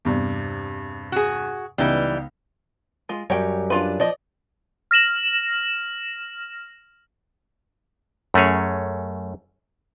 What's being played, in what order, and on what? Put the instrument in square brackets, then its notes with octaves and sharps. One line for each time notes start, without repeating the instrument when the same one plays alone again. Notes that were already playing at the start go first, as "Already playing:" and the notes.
[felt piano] E2 G2 C3
[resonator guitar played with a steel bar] F#4 G#4
[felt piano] C#2 B3 D#4 [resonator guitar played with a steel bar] E3 G3
[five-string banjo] G#3 F4
[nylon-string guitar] F#2 G3 [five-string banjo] C#5 G5
[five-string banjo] D4 F4 B4
[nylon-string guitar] F3 [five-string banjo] D5 D#5
[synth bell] F6 A#6 E7 F#7
[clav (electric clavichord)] F#2 A3 C#4 G#4 C#5